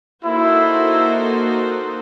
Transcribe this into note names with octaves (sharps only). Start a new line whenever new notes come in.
A#3 D#4 E4 F#4 A4 C5